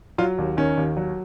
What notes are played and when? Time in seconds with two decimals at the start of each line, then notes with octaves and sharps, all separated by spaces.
0.18 F#3 F4
0.38 D#2
0.57 D#3 C#4
0.77 D#2
0.97 F#3